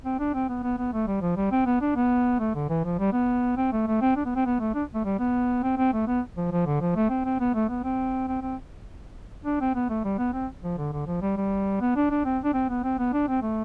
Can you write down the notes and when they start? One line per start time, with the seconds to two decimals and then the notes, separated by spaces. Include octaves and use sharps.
0.04 C4
0.19 D4
0.34 C4
0.49 B3
0.63 B3
0.78 B3
0.93 A3
1.07 G3
1.22 F3
1.37 G3
1.52 C4
1.66 B3
1.81 D4
1.95 B3
2.39 A3
2.55 D3
2.69 E3
2.84 F3
2.99 G3
3.13 B3
3.57 C4
3.72 A3
3.87 A3
4.02 C4
4.16 D4
4.25 B3
4.36 C4
4.46 B3
4.60 A3
4.74 D4
4.94 A3
5.05 G3
5.19 B3
5.63 C4
5.77 C4
5.93 A3
6.07 B3
6.37 F3
6.52 F3
6.66 D3
6.81 F3
6.96 A3
7.10 C4
7.25 C4
7.40 B3
7.54 A3
7.69 B3
7.84 C4
8.27 C4
8.42 C4
9.45 D4
9.61 C4
9.75 B3
9.89 A3
10.04 G3
10.18 B3
10.34 C4
10.63 F3
10.78 D3
10.92 D3
11.07 F3
11.22 G3
11.37 G3
11.81 B3
11.96 D4
12.10 D4
12.25 C4
12.43 D4
12.54 C4
12.70 B3
12.84 C4
12.99 B3
13.13 D4
13.28 C4
13.42 A3